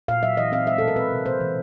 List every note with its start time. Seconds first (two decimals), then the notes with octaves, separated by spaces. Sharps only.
0.08 A#2 F5
0.23 F#3 E5
0.37 E3 D#5
0.52 C4 F5
0.67 G#3 E5
0.78 B2 A4
0.88 A#4
0.96 C4 B4
1.11 C3
1.26 A#3 C5
1.40 E3